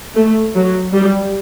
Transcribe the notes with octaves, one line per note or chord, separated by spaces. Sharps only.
A3
F#3
G3